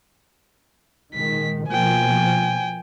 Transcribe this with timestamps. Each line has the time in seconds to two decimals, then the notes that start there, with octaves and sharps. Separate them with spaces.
1.14 A#2 D#3 G#3 B6
1.68 B2 F3 A#3 G5 G#5